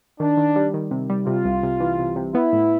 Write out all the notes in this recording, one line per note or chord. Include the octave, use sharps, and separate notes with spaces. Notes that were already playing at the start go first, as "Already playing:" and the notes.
D#3 D4
D#3
G3
D#3
C3
G3
C3 F4
C2
C3
E3
C3
C3
B3 E4
A2